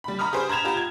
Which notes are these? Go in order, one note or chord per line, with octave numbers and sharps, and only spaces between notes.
G3 B5
A#5 B5 C#6 D#6 F6
G4 G#4 C5
A#5 B5 G#6 E7 F7
F4 G4 A#5
G#6